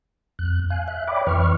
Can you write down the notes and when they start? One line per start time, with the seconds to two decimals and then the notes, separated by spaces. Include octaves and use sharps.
0.39 F2 F#6
0.70 F5 G#5 F#6
0.88 E5 F#6
1.08 C#5 D5 E5 G5 B5 D6
1.27 F2 E3 B4 C#6 F6